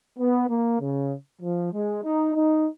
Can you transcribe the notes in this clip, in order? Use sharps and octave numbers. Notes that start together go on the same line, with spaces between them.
B3
A#3
C#3
F3
G#3
D#4
D#4